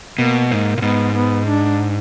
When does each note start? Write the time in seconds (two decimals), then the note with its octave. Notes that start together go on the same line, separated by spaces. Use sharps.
0.19 B2 A#3
0.50 G#2 A#3
0.78 A#2
0.82 G#2 B3
1.15 B3
1.47 D4